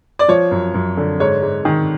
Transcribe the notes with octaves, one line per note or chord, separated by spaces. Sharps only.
D5
F3 C#5
F#2
F#2
D3
G#2 C#5
G#2
D#3